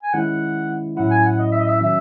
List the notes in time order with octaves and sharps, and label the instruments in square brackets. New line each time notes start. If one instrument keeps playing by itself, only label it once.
[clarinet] G#5
[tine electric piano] D#3 G#3 C#4 E4 [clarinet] F#5
[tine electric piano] A2 F#3 C#4 E4 [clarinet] F#5
[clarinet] G#5
F#5
D#5
E5
D#5
E5
[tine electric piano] D#3 F#3 C#4 [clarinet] E5